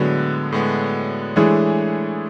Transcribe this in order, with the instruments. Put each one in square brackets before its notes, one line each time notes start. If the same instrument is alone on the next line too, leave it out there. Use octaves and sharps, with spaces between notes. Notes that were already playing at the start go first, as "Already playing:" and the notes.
Already playing: [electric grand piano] A2 G#3 B3 [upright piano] D3 F#3
[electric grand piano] A2 G#3 B3
[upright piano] E3 G#3 [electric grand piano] A3 D4 G#4 C#5